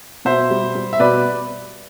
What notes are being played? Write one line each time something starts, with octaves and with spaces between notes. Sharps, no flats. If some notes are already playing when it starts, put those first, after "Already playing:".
B2 C5 E5
G3
G3
E5
B2 B4 D5